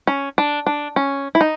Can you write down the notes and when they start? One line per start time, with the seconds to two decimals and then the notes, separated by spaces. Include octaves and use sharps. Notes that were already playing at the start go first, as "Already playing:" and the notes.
0.07 C#4
0.38 D4
0.67 D4
0.96 C#4
1.35 E4
1.41 D#4